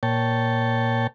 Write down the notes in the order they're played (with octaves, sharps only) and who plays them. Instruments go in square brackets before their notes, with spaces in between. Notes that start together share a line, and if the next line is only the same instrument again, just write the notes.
[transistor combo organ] A#2 C#5 G5 A5